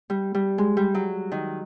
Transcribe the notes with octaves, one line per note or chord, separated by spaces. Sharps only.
G3
G3
G#3
G3
F#3
D#3